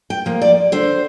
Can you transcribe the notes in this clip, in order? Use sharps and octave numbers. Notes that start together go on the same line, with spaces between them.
G5
F3 A#3
D5
D3 C5